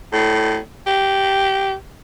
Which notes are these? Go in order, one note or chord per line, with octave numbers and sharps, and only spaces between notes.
A2
G4